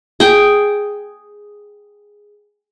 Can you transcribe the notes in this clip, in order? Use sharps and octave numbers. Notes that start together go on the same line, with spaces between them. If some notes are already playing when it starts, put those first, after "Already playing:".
G#4 G5